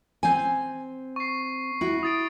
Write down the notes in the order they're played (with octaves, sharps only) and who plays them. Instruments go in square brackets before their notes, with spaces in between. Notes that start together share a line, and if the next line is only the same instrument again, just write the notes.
[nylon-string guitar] C4 G#5
[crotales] C#6 C7
[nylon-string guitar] E4 F#4
[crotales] D#6 A6 D7